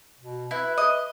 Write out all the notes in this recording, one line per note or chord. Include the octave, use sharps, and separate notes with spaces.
B2
E4 B4
D#5